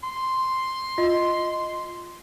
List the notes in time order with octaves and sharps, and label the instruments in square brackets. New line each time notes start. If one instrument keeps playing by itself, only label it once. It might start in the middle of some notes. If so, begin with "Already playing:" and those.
[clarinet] C6
[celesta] F4 D#5